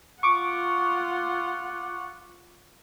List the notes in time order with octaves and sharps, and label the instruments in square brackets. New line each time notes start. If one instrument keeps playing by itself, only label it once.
[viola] F4 F#5 [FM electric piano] C#6 D6